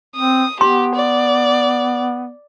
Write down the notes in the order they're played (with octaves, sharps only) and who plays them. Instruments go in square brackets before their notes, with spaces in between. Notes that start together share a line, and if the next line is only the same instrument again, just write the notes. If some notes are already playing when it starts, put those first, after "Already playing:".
[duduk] C4 [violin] D#6
[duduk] B3 [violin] G4 [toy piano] C6
[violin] D5